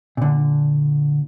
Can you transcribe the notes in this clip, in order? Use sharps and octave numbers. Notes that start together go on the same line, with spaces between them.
A#2 D3